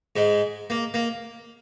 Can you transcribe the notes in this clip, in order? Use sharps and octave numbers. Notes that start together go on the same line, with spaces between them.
G#2 G#3
A#3
A#3